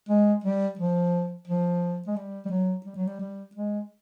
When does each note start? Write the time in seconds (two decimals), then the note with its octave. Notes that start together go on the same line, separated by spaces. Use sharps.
0.09 G#3
0.44 G3
0.79 F3
1.47 F3
2.07 G#3
2.16 G3
2.45 G3
2.50 F#3
2.85 G3
2.96 F#3
3.07 G3
3.20 G3
3.55 G#3